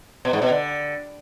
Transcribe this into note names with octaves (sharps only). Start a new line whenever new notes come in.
B2
G#2
B2
D3